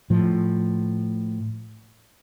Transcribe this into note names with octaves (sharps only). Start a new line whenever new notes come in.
A2 F3